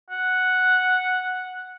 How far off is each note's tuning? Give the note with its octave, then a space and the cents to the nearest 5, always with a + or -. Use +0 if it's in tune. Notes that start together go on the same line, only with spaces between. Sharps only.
F#5 -5